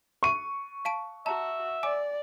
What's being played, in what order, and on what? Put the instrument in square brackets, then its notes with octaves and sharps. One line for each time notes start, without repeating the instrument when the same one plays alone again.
[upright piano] C#6 D#7
[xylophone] F5 A5 D7
[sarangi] F#4 [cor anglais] E5 [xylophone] A5 A#5
[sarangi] D5 [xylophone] G#5 D6